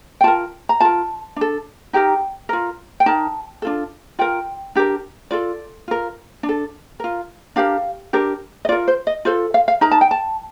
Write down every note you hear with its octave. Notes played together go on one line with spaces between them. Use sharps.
G5
F4 A#4 A5
A#5
F4 A#4 A5
D4 A4
D#4 G4 A#4 G5
F4 A#4
G5
D#4 A#4 A5
D4 F4 A4
F4 A#4 G5
D4 G4 A#4
F4 A4 D5
F4 A#4
D4
A4
F4 A#4
D4 G4 A#4 F5
D4 G4 A#4
D#5
F4 A#4 D5
C5
D#5
F4 A4 C5
F5
F5
D#4 A#4 A#5
A5
G5
A5